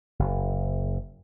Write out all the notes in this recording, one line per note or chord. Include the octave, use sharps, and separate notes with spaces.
F#1